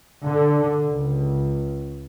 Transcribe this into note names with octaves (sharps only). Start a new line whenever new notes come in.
D3
C#2